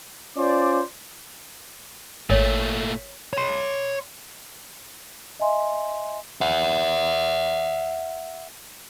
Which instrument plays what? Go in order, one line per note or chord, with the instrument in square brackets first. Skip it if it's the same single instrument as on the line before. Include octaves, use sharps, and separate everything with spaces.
[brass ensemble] C#4 F4 C5 D5
[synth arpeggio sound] G#1 [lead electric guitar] A#2 A3 [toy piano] A#4 C#5
[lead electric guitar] C#5 C6
[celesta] D#5 E5 G#5 C6
[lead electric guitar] E5 F#5